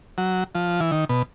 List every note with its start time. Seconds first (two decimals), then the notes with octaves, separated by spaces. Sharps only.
0.18 F#3
0.55 F3
0.80 E3
0.92 D#3
1.09 B2